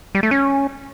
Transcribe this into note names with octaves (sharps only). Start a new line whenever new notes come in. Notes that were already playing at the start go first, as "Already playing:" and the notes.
G3
A3
C#4